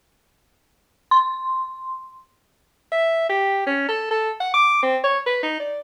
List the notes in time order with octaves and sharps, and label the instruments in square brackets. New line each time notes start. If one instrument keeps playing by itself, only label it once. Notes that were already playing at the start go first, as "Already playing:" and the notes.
[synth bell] C6
[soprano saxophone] E5
G4
C#4
A4
A4
F#5
D6
C4
C#5
B4
D#4
D5